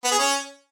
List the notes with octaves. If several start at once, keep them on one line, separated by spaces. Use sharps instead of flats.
B3
G#4
C#4